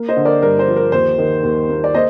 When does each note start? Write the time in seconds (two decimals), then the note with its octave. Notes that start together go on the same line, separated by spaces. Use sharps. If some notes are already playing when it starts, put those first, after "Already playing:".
Already playing: A#3
0.08 C5 D#5
0.16 D3
0.25 A#4 D5
0.42 G2 A#4
0.59 C5
0.67 F3
0.76 A#4
0.92 D#2 C5
1.18 D#3
1.43 D#2
1.69 A#3
1.84 D5
1.94 A#3 C5 D#5